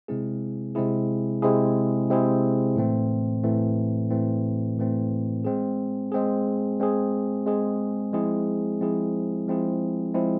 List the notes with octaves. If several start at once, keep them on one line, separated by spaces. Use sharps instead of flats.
C3 G#3 C4 E4 G#4
C3 G#3 C4 E4 G#4
C3 G#3 C4 E4 G#4
C3 G#3 C4 E4 G#4
A2 E3 A3 C4
A2 E3 A3 C4
A2 E3 A3 C4
A2 E3 A3 C4
G#3 C4 G#4
G#3 C4 G#4
G#3 C4 G#4
G#3 C4 G#4
F3 G#3 C4 E4 G#4
F3 G#3 C4 E4 G#4
F3 G#3 C4 E4 G#4
F3 G#3 C4 E4 G#4